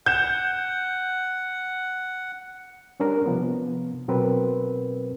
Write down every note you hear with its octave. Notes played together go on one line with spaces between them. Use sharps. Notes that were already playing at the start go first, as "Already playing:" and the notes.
F#5 G6 E7
G3 C#4 D4 A#4
C3 F3 B3
B2 F#3 C4 A#4 B4